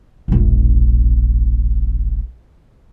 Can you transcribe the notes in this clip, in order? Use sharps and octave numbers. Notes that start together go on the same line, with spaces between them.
E1 A#1